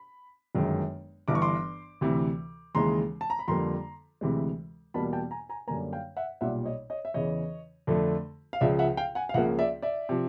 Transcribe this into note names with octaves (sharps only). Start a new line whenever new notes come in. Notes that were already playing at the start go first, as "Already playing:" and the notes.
Already playing: B5
G1 F#2 D#3 G#3
G1 G2 E3 D6
C#6
C6 D6
D2 C3 E3
D#2 C#3 E3 G#3 A#5 C6
A5
A#5
B5
F2 D3 G3 A#3 A#5 C6
D2 C3 E3 G#3
E2 B2 G3 A#3 A5 B5
G5 A5
G#5 A#5
G#5 A#5
F#2 D3 G3 A#3 G#5 A#5
F5 G5
E5 F#5
B1 A#2 G3 E5 F#5
C#5 D#5
C#5 D#5
E5
E2 C#3 E3 C#5 D#5
F2 D3 F3 A3
F5
C#2 C#3 F3 D5 E5
E5 F#5
F5 G5
F#5 G#5
F5
C#2 C#3 F3 A#3 E5 F#5
D5 E5
D5 E5
C3 F3